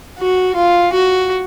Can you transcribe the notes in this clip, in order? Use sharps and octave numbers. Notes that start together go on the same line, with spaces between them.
F#4
F4
F#4